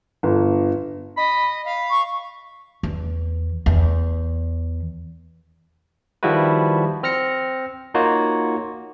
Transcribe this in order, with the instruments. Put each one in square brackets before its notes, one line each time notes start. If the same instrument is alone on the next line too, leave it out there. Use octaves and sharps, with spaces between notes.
[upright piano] G1
[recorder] D#5 [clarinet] B5
[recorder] F5 [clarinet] B5
[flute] C#6
[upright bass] E2
E2
[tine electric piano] D#3 F3 G3 E4 F#4 B4
C4 F6 A#6 C#7
A#3 D#4 F4 F#4 C#5